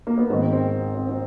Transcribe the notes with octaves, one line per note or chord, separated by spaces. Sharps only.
A#3
B3
G#2 D#3 C4
C4
C4
C4